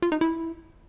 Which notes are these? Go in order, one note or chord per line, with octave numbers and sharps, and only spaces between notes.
F4
D#4
E4